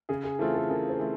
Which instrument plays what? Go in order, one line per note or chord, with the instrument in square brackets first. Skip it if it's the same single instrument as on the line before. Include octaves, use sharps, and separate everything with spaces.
[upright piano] C#3 [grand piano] G#4
[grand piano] G#4
[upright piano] E3 A3 C4 F4 [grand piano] A4
[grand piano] A4
[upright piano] C#3 [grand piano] A#4
[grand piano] C5
[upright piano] E3 A3 C4